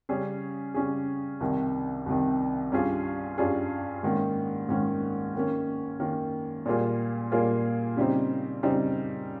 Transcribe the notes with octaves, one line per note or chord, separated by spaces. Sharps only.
C#3 G3 C#4 G#4
C#3 G3 C#4 G#4
C2 C3 D#3
C2 C3 D#3
G2 G3 C#4 F4 G#4
G2 G3 C#4 F4 G#4
G#2 D#3 A#3 C#4
G#2 D#3 A#3 C#4
D#3 A#3 C#4
D#3 A#3 C#4
A#2 G3 A#3 F4 G#4
A#2 G3 A#3 F4 G#4
C#3 G3 C4 D#4
C#3 G3 C4 D#4